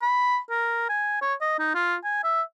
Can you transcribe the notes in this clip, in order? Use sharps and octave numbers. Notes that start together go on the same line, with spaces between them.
B5
A#4
G#5
C#5
D#5
D#4
F4
G#5
E5